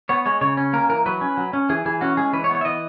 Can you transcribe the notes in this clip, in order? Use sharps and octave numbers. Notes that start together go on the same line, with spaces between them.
B3 C#5
G#3 C#5
C#3 C#5
C#4
A#3 A#4
E3 A#4
F#3 B4
C#4
F#3
C#4
E3 G#4
E3 G#4
C#4 F#4
G#3 G#4
E3 B4
C#5
B3
C#5
E5
E3 D#5